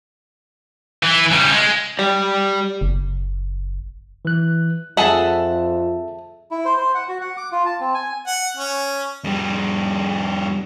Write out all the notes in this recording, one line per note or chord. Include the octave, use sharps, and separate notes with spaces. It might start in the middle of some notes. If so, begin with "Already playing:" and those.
E3
C#3 G3
G#3
G4 D5
F#1
E3 F#6
F2 G#4 A4 E5 F#5 A5
E4
C5
C5
F#5
F#4
F#5
D6
F4
A5
C4
G#5
F#5
C#4
F2 G3